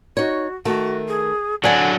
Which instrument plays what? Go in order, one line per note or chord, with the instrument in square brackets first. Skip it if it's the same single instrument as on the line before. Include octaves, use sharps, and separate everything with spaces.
[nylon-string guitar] D#4 C#5 [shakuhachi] F#4
[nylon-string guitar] D#3 A3 [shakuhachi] F#4
[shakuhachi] G#4
[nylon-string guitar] D3 G#5 [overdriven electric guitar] F#3 D4 [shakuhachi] C#5